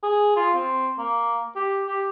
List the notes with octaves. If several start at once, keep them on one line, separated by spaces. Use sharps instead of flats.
G#4
F4
C4
A#3
G4
G4